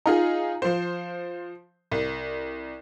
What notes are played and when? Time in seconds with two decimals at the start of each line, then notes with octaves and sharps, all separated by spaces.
0.06 D#4 F4 G#4
0.62 F3 C5
1.91 C2